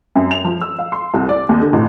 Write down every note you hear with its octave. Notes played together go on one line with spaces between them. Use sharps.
F#2
F7
F3
E6
F5
C6
C2
D5
D#2
D3
A1